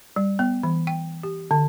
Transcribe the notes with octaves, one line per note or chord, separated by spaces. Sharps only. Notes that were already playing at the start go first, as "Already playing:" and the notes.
G3
B3
E3
G5
G4
D3